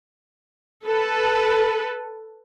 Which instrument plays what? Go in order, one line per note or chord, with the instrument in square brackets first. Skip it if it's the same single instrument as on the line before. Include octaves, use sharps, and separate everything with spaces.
[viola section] A4 B4